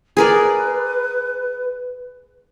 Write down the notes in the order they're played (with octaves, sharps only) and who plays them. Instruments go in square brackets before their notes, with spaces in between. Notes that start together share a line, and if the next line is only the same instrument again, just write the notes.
[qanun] G#4 A#4 D5 [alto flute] B4